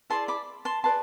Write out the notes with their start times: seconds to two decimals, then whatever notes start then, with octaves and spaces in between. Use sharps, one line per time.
0.10 E4 G#4 D5 A5 C6
0.28 B5 D6
0.65 A5 C6
0.84 G#4 B4 D5 A5 C6